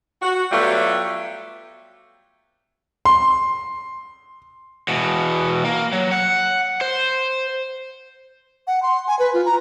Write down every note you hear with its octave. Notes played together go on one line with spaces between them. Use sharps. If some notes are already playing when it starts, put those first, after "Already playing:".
F#4
F#3 G3 A3 B3 F4
C6
E2 B2
A#3
F#3
F#5
C5
F#5
C6
G#5
B4
F4
A#5